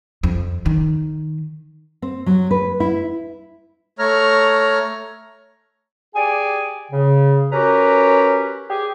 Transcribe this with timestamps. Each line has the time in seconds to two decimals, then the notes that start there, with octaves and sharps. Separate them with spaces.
0.23 F2
0.66 D#3
2.02 C4
2.26 F#3
2.51 B4
2.80 E4
3.99 A3 C#5 A#5 F6
6.15 G4 G#4 D5 G#5
6.91 C#3
7.52 C#4 F#4 G4 A#4 B4 A#5
8.69 G4 G#4